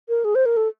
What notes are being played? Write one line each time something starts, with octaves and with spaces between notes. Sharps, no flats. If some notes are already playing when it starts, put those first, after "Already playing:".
A#4
G#4
C5
A#4
A4